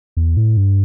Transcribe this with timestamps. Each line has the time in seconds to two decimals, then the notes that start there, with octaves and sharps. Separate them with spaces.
0.17 E2
0.37 A2
0.57 G2